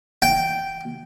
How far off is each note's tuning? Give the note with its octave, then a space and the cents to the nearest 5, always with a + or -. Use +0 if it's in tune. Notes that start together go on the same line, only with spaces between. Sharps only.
G5 -10